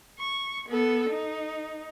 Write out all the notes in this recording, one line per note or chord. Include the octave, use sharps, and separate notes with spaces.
C#6
B3 A4
D#4